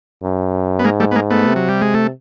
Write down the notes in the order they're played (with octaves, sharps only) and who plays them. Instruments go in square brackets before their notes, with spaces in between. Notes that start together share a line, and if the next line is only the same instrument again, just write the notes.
[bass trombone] F#2
[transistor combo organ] B3
[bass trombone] G#2 [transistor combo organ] G#3 A#3
[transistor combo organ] G3 A3
B3
G#3 A#3
A3 B3
[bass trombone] C3
[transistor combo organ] F#3
G3
G#3
A3